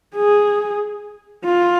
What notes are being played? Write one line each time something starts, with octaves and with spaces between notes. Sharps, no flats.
G#4
F4